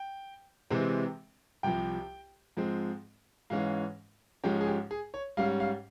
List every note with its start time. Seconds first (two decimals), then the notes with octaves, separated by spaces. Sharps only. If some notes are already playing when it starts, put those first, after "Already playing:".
Already playing: G5
0.70 C3 E3 G#3 C4
1.63 C2 C3 F3 G5
2.57 G#2 F3 G#3 C4
3.50 G#2 E3 G#3 C#4 F5
4.44 G#2 F3 G#3 C#4 G4
4.61 G#4
4.67 G4
4.91 G#4
5.14 C#5
5.37 G#2 G3 C#4 F5
5.60 F5